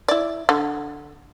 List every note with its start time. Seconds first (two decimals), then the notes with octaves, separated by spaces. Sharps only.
0.08 E4 D5
0.49 D3